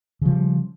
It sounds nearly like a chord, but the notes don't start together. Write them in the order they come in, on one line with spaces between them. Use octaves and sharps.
C#3 F3 G3